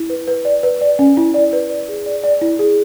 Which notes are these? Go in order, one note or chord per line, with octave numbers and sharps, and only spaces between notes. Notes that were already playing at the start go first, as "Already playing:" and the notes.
Already playing: E4
B4
B4
D5
B4
D5
C#4
E4
D5
B4
D5
G#4
D5
D5
E4
G#4